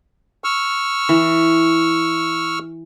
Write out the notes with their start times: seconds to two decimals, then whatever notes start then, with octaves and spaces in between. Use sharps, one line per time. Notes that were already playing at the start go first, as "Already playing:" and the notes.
0.44 C#6 E6 F6
1.09 E3